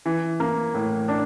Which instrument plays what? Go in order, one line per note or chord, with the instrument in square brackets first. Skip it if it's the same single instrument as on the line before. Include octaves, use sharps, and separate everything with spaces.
[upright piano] E3
A#3
A2
D4